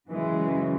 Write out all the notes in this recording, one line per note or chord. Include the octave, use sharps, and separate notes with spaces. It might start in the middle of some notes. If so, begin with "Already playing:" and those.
F#2 C#3 E3 G#3